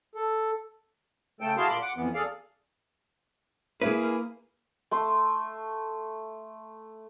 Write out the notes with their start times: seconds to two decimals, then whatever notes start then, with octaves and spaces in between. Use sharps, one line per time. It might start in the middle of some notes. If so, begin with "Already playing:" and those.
0.15 A4
1.41 C#3 A3 A4 G5 E6
1.57 E4 F#4 G#4 F5 A5 C6
1.69 A#2 B5 C6 D6
1.82 F#5 D6
1.96 F2 E3 B3
2.14 G#4 A4 D5 F5
3.82 A#3 E4 G#4 B4
4.91 A3 C6